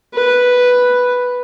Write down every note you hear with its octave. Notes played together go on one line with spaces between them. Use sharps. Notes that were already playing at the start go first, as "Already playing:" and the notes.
B4